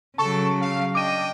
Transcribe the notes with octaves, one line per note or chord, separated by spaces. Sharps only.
C#3 F#3 A4 A5 C#6
F5
D4 D#5 G5 D6 D#7